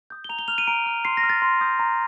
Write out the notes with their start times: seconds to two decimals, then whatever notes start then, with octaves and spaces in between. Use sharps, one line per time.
0.10 D#6 G6
0.24 G7
0.29 A#5 F7
0.39 G7
0.48 F6 F7
0.58 D#7
0.67 A#5 D7
0.86 F6
1.05 C6 C7
1.17 A#6
1.23 F6
1.29 A6
1.42 C6
1.61 D#6 G6
1.79 A#5